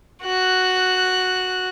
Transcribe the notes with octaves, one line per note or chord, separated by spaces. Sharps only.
F#4 F#6